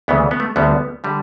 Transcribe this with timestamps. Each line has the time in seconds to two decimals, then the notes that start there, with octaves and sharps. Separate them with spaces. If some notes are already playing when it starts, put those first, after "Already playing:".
0.08 D2 C#3 E3 B3
0.31 B3
0.40 A3
0.56 D2 D3 G3 B3
1.04 D3 G3